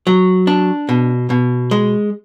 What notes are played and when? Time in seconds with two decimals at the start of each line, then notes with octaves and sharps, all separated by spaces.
0.07 F#3
0.47 D4
0.89 B2
1.30 B2
1.71 G#3